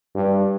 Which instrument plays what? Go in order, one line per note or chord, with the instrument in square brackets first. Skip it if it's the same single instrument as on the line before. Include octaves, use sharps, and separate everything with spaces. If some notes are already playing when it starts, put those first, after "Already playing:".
[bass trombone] G2